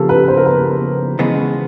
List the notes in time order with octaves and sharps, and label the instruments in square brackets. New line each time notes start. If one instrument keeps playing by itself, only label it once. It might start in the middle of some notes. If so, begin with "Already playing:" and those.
Already playing: [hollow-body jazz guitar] C#3 F3 A#3 [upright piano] G4 A4
[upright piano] B4
C5
A#4
B4
[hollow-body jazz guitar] C#3 E3 G#3 B3